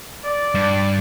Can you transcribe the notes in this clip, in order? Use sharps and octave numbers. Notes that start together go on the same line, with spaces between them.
D5
G2